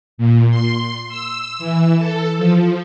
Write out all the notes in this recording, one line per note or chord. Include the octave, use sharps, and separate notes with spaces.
A#2
C6
E6
E3
A4
F3